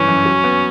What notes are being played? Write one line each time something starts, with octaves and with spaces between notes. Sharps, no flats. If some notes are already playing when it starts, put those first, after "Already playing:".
Already playing: G2 C#3 E3 C#4
F#2
F#3
B3